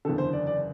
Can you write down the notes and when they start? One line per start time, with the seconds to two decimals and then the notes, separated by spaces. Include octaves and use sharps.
0.05 F#1 E2 D3 A4
0.18 C5
0.33 D5
0.47 D5